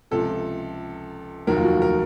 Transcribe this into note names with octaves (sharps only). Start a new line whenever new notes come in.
C#2 C3 F3 A4
F1 D#2 D#3 F#3 A#4
F4
F#4
A#4